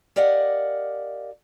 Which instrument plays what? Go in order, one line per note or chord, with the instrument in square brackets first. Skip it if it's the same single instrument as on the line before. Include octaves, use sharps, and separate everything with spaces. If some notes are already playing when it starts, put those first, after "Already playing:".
[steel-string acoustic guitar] G4 A#4 D5 D#5 F5 F#5